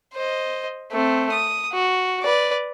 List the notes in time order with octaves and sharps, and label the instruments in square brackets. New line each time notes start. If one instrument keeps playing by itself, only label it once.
[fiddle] C5 D#5
A3 C4
D#6
F#4
B4 D5